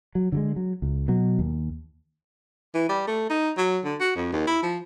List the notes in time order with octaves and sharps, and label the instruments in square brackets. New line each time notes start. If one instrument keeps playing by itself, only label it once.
[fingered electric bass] F#3
D3 F#3 G#3
F#3
C#2
B2 F#3
D#2
[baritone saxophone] E3
G3
A3
D#4
F#3
D3
F#4
F2
D#2
E4
F3